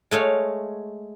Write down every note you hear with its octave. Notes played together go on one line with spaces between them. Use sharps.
G#3 A3 C#5 F5